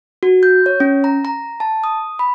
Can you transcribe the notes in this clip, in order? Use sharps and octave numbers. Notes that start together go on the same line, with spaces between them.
F#4
G6
C#5
C#4
A#5
A#5
A5
D#6
B5